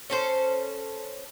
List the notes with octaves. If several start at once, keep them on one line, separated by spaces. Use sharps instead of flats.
C#4 A4 C5